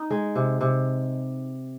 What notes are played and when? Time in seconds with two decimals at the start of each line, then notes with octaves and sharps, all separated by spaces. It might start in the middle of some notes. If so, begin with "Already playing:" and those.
Already playing: D#4
0.11 G#3
0.36 C3
0.61 C3